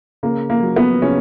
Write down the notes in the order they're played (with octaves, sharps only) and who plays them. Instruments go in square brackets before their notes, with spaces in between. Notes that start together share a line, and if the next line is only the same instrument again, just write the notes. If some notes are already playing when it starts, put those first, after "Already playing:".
[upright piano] C#3 A#3
A#3
F#3
B3
C#3 C#4